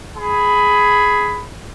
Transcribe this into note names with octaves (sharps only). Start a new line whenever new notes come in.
G#4 B5